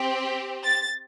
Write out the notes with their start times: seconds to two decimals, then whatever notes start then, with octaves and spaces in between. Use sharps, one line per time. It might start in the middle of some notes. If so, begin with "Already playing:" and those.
Already playing: C4 G4
0.65 A6